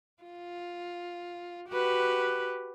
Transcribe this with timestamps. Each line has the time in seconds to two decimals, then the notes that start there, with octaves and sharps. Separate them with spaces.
0.23 F4
1.68 F#4 G4 B4